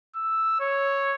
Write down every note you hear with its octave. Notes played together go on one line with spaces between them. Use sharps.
E6
C#5